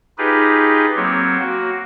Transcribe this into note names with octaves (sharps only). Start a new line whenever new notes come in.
D#4 F4 G4 G#4 B4
F#3 A#3 C4 C#5
A#3 F#4